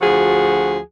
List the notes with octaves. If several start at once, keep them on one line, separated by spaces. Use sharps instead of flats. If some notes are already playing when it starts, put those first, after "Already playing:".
D2 F3 F#4 G#4